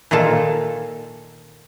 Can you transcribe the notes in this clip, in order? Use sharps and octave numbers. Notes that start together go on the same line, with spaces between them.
A#2 D#3 F4 A4 A5